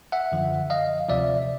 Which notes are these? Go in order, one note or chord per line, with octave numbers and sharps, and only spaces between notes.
E5 F#5
F#2 D3 F3
D#5 F5
D2 C3 F3 D5 E5